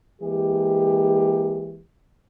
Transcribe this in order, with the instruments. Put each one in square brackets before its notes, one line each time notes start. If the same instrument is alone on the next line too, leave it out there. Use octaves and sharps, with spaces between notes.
[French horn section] E3 G#3 A#3 G4